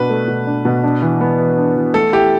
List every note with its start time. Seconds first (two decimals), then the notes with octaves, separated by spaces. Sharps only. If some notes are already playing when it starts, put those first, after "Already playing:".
Already playing: B2 D4 B4
0.10 A3
0.28 B2
0.47 D4
0.65 B2
0.83 D4
1.02 E3
1.21 B3
1.39 E3
1.58 D4
1.76 E3
1.94 A3 A4
2.13 E4 G4